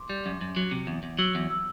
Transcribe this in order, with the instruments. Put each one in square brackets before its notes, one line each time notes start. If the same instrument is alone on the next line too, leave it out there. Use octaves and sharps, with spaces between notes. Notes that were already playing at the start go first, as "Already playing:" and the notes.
Already playing: [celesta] C6 D6
[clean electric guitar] G3
F#2
F#2
F#3
C3
E2
E2
[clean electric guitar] F#3 [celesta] E6
[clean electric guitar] E2
[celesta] E6